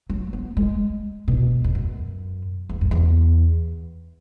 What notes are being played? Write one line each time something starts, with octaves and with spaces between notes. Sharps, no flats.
F#3
B3
G#3
B2
E2
F#2
E2
F#2
E2